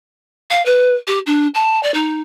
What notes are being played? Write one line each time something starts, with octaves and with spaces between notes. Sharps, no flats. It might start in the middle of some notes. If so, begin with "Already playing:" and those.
F5
B4
G4
D4
A5
D5
D#4